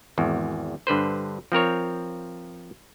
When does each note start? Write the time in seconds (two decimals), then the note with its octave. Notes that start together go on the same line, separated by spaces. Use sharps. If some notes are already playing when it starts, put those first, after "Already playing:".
0.18 G#1 E2
0.87 G2 D3 B4 C5
1.52 F3 C4 A#4 C#5